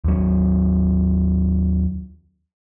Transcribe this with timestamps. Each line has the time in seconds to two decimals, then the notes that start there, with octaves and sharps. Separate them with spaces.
0.04 D#2 F#3